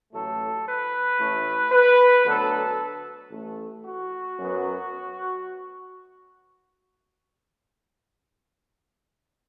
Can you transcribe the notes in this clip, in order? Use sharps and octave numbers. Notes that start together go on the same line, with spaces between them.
A1 A2 F#3 A3 A4
B4
A1 A2 A3
B4
D2 D3 F#3 B3 A4
A1 A2 A3
F#4
F#2 F#3 B3